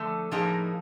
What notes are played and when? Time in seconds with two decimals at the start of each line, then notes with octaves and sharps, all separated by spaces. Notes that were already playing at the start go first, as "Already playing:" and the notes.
Already playing: D3 F3 A3
0.32 A2 F3 A#3 D#4 G#4